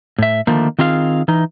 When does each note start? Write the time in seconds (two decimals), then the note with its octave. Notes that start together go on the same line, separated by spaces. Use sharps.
0.19 A2 E5
0.47 D3 D#3 F3 A3 A#3
0.79 D#3 C4 F4 G#4 F5
1.28 E3 D#4